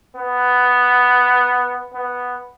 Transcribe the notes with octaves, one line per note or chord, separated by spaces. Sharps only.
B3
B3